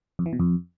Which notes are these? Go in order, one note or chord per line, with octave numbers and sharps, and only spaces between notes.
F2
E3
B2
F2